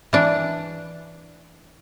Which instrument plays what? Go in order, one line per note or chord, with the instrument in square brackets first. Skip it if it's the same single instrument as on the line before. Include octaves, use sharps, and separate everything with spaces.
[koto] E3 D4